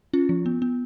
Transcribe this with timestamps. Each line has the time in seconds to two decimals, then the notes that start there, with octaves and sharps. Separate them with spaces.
0.13 C#4 F4
0.29 F3
0.46 B3
0.62 B3